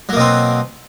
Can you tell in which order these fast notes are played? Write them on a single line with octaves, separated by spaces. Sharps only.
F#3 A#3 B2 C4